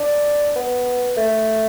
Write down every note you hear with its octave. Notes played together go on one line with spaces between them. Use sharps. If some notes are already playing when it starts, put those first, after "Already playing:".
Already playing: D4
B3
A3